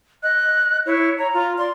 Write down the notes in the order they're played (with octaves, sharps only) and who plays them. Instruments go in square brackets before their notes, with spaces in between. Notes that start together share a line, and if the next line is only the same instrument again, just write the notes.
[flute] D#5 [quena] F#6
[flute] E4 [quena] C#5
[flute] C#5 [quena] A#5
[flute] F4
[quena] D5 [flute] C6